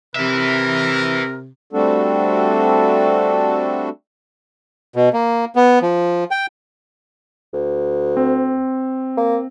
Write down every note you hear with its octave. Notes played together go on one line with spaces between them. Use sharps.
C3 A#4 B4 E5
G3 A3 C4 D4 F#4 A4
B2
A#3
B3
F3
G5
D2
C4
A#3